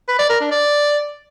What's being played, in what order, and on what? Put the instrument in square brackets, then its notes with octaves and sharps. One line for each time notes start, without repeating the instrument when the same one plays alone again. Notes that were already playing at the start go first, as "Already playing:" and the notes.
[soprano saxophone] B4
D5
A#4
D4
D5